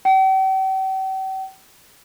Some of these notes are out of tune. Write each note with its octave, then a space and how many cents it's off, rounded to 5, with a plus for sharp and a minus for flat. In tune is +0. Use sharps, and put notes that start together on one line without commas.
G5 -45